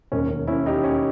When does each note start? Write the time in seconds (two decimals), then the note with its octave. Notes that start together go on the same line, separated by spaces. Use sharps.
0.12 E1 D#2 D#3 C#4
0.30 C#4
0.47 C#4 E4
0.66 D#4 G4
0.84 C#4